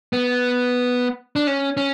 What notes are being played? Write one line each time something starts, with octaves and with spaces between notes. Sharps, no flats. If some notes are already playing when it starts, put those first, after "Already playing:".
B3
D4
C#4
C#4